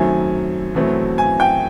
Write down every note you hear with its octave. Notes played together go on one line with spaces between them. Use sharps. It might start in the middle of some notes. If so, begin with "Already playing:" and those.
Already playing: F#2 D#3 F#3 A3 C4 G#5
E2 B2 F#3 A3 C4
G#5
G5